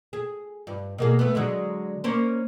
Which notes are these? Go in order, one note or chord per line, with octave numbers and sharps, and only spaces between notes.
G#4
G2
B2 A#3 G#4
A3 B3
D3 F#3 G#3
A#3 C#4 C5